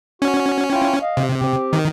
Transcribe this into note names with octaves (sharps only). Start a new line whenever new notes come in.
C#4 F#4
E4 F4 G5
D#5 F5
C3
C4 G4
D#3